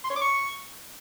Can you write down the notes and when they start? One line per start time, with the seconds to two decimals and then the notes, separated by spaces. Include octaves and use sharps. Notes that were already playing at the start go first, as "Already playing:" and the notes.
0.04 C6
0.10 C#5
0.16 D6
0.22 C#6